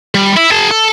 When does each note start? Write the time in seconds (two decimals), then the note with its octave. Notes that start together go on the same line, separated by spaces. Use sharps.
0.15 G3
0.37 E4
0.51 G#4 A5
0.71 A4